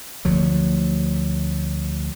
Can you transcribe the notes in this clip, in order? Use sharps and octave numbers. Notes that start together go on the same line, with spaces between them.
D2 F3 F#3